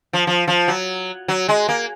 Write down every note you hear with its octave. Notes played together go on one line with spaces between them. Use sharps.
F3
F3
F3
F#3
F#3
G#3
A#3